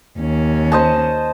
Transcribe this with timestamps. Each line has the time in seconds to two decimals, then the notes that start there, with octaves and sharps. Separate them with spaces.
0.19 D#2 C#4
0.72 C5 D#5 A5